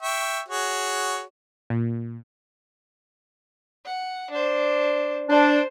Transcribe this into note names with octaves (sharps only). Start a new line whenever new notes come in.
E5 G5 C#6
F#4 G#4 C#5
A#2
F#5
D4 C5
D4 C5